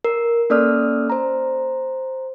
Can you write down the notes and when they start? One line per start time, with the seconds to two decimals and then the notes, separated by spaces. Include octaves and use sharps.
0.05 A#4
0.50 A#3 C#4 A4 D5 D#6 F6
1.10 C5 A#5